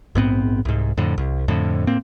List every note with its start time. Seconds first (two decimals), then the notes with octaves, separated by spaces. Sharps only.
0.15 A#1 G#2 B3 C4
0.65 C2 G#2
0.97 F2 A2 D3
1.18 C2
1.48 F2 A2 D3
1.87 A2 A#3 C4